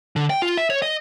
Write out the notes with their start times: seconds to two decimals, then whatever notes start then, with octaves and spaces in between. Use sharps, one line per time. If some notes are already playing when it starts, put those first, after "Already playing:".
0.16 D3
0.30 G5
0.42 F4
0.57 E5
0.70 C#5
0.82 D#5